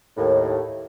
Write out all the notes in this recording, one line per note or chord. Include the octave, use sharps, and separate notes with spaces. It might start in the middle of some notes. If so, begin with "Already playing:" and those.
D#2 A2